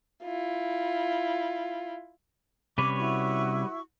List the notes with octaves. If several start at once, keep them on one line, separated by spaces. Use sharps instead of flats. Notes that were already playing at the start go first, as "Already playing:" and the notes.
E4 F4
C3 G3 C#4 B4 C#5 D6
E4 F#4 C#6